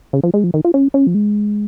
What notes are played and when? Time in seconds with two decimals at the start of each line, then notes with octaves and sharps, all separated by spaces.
0.13 C#3
0.23 F3
0.34 G#3
0.44 F3
0.54 D#3
0.65 F4
0.74 C#4
0.94 C#4
1.07 F3
1.14 G#3